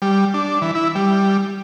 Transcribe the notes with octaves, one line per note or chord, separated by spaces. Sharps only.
G3
D4
E3
E4
G3